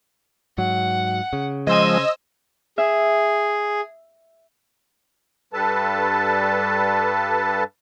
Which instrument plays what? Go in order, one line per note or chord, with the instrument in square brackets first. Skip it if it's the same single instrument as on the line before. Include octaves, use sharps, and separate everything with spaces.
[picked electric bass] G#2 F#3 [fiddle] F#5
[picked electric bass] C#3
[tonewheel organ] F3 G#3 [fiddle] C5 G#5 [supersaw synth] D#5 E6
[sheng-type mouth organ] G#4 [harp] E5
[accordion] G2 G3 A4 B4 A5